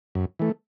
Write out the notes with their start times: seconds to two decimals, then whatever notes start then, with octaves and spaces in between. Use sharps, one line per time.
0.15 F#2
0.39 E3 A3